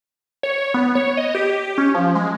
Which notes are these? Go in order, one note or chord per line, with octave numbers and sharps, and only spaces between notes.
C#5
B3
C#5
D#5
G4
C#4
F3
G#3